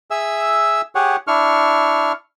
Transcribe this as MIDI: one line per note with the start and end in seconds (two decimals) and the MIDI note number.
0.11 0.81 68
0.11 0.81 76
0.11 0.81 88
0.95 1.16 67
0.95 1.16 68
0.95 1.16 73
0.95 1.16 78
1.27 2.12 62
1.27 2.12 64
1.27 2.12 85
1.27 2.12 89